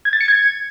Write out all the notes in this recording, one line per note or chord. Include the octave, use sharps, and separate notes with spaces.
G#6
A6
C#7
G#6